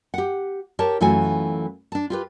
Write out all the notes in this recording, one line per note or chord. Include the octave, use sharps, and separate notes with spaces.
G4 F#5
G4 A#4 C#5 A5
F#2 E3 A3 F4 F#4 G#5
D4 A5
F4 G4 B4